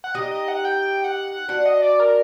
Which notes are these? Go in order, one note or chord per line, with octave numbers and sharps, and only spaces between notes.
F#5
D#4 G4 D#5
D#5
F#5
G5
G5
F#5
F#5
D4 F#4 F#5
D#5
D5
A#4